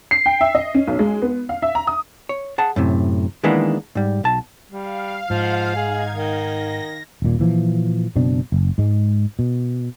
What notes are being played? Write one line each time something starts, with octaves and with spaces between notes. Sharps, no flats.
C7
G5
E5
D#5
C#4
B1
G#3
B3
F5
E5
A#5
D#6
C#5
G#4 F#5 A5
F#2 A2 C3
D#3 E3 G#3 A#3 B3 D4
G#2 G3
B1 A5
G3 F5
G#2 F3
D#4 G#4 G#6
D#3 A#6
D#1 A#2
A#2 E3 F3
F#1 B2 C4 D4
F#1
G#2 G#3
B2